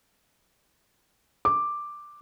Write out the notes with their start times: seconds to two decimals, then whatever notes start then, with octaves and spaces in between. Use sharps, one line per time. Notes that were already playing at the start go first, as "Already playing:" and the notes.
1.45 D6